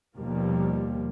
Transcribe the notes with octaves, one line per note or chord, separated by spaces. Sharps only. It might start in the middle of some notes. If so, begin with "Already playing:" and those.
D#2 B2 F3 G3 A#3